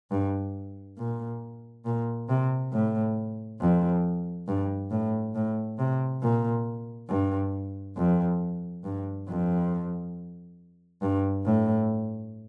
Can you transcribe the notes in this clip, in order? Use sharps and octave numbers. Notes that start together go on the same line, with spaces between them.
G2
A#2
A#2
C3
A2
F2
G2
A2
A2
C3
A#2
G2
F2
G2
F2
G2
A2